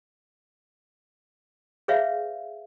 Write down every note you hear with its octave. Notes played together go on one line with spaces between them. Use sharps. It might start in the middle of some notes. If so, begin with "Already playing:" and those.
G#4 B4 C#5 E5 F5